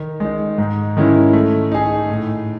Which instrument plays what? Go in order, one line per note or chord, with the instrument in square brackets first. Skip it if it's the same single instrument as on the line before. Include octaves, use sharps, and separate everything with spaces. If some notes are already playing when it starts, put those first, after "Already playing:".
Already playing: [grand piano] D#3
G#3 D#4
G#2
D#3 G#3 C#4 E4
A3
D#4 G#4
A2